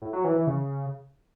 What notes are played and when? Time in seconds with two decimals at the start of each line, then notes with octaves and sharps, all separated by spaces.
0.02 A2
0.13 F#3
0.24 E3
0.36 E3
0.47 C#3